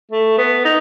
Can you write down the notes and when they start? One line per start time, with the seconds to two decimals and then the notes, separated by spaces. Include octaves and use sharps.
0.12 A3
0.38 B3
0.65 D#4